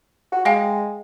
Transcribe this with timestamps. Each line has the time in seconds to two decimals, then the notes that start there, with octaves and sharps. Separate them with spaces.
0.32 F#4
0.45 G#3 D#5 F5 G5